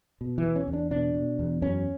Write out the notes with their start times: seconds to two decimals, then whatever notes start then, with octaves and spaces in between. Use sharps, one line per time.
0.21 B2
0.38 E3
0.44 E2
0.56 C#4
0.68 E2
0.73 D4
0.91 B2 D4
1.15 B2
1.39 E2
1.62 F#2 C#4